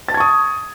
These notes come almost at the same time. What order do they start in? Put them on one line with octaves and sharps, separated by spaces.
A6 A5 G#6 C#6 D#6